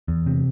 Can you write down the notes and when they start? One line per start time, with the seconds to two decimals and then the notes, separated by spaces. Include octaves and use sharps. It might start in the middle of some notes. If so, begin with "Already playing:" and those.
0.08 E2
0.26 C3